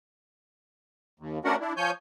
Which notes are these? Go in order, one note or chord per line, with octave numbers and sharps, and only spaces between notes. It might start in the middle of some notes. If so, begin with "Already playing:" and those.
D#2
A3 C#4 D4 F#4 A#4 F#5
D4 E4
F3 C#5 G#5 G6